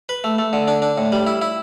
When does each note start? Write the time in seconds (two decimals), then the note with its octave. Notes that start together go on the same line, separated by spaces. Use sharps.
0.09 B4
0.24 A3
0.38 A3
0.53 D3
0.68 D4
0.82 D4
0.98 A2
1.12 G3
1.27 E4
1.42 E4